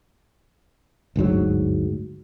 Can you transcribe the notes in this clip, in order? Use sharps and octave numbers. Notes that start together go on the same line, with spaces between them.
G1 D2 G#2 F#3